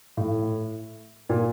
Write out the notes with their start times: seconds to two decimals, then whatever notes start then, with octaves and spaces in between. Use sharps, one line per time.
0.17 A2
1.29 A#2